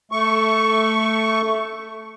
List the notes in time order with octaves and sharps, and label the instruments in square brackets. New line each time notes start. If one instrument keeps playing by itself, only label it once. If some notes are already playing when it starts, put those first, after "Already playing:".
[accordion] A3 C#6